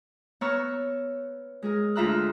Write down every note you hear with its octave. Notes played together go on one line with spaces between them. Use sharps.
B3 C#5 A#5 C#6 E6 F6
G#3 G#4 A#4
D2 F4 E5 A#5 E6 F#6